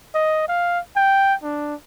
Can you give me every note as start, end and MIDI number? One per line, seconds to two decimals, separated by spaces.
0.14 0.45 75
0.48 0.79 77
0.96 1.34 79
1.43 1.75 62